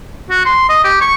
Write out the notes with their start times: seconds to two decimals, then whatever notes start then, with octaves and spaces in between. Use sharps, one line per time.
0.30 F#4
0.46 C6
0.69 D#5
0.84 G4
1.01 C#6